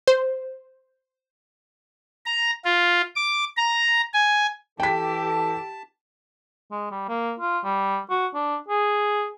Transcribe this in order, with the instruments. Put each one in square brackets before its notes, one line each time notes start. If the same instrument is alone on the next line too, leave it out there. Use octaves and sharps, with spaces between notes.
[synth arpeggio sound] C5
[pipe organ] A#5
F4
D6
A#5
G#5
[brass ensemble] E3 A4 [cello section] G4 [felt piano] G5 B6 [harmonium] A5
[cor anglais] G#3
G3
A#3
F4
G3
F#4
D4
G#4